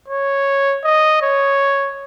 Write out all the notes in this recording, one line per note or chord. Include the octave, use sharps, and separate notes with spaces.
C#5
D#5
C#5